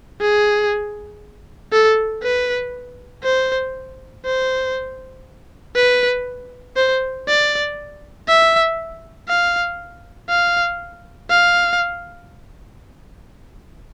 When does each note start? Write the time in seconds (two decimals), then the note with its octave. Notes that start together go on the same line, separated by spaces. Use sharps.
0.21 G#4
1.72 A4
2.23 B4
3.23 C5
4.25 C5
5.76 B4
6.76 C5
7.28 D5
8.28 E5
9.29 F5
10.29 F5
11.30 F5